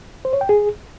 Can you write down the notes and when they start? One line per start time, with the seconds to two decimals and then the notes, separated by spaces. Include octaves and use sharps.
0.25 C5
0.33 C#5
0.41 G5
0.49 G#4